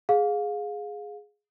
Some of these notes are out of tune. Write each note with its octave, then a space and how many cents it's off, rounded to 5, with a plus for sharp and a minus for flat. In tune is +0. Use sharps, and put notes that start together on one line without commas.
G#4 +0 F5 +25